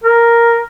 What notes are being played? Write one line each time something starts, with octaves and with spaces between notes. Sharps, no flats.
A#4